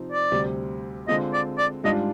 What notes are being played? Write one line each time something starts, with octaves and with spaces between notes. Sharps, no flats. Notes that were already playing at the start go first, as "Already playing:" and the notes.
Already playing: C3 F3 C4 D#4
D5
D2 C3 G3
D3 G#3 C4 F4 D#5
D5
D5
G#2 G3 D4 F4 D#5